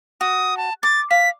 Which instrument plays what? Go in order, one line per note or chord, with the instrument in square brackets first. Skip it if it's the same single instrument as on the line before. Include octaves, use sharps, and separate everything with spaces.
[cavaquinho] F#4 [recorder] D#6
[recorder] A5
[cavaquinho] D6 [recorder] A6
[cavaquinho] F5 [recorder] B6